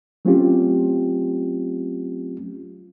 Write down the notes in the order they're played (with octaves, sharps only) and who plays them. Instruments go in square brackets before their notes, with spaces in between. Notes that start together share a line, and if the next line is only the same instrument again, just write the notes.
[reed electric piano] F#3 A3 C4 C#4 F4 G4